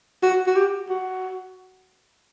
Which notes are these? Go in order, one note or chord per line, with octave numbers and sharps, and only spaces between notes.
F#4
F#4
G4
F#4